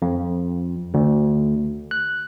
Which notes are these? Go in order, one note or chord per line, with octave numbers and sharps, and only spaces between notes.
F2
D2
F#6